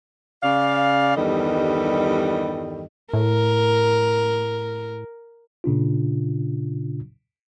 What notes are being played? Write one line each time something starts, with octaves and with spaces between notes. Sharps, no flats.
C#3 D5 F5
E2 G2 D#3 G3 A4 D#5
A2 A#4
A#2 C#3 D4 F4